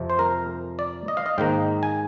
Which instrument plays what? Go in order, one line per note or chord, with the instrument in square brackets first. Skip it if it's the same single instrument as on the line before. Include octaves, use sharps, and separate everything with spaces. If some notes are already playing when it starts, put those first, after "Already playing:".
Already playing: [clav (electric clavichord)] F2 C3 F3
C5
A#4
D5
D#5
F5
D#5
G#2 D#3 A#3 G5
G#5